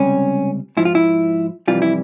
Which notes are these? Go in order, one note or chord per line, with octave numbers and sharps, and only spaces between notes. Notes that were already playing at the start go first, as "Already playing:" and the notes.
Already playing: C#2 C3 G3 C#4
G#2 F3 E4
F4
E4
F2 C3 E3 G3 F4
E4